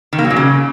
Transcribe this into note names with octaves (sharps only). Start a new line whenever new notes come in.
D#3
A#3
F#3
A#2
C#3